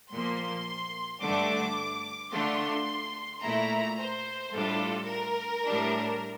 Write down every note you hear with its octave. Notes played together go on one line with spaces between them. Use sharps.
A#2 F3 A#3 C6
G2 D3 A3 D4 D6
D3 A3 D4 F4 C6
A#2 A3 E4 A#5
C5
A2 G3 D4 F4 A4
A#4
A2 G3 D4